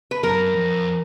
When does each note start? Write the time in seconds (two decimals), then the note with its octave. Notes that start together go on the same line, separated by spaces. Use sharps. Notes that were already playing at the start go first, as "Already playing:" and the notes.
0.11 B4
0.23 F#2 A#4
0.55 F2